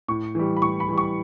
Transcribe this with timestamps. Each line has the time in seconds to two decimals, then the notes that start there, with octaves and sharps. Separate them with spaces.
0.08 A2 C#6
0.35 E3 G3
0.57 B5
0.62 A2 C#6
0.80 B5
0.89 E3 G3
0.98 C#6